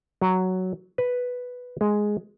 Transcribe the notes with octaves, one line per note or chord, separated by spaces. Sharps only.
F#3
B4
G#3